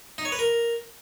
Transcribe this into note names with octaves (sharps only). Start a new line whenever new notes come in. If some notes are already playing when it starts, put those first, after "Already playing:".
D#4
C#5
B4
A#4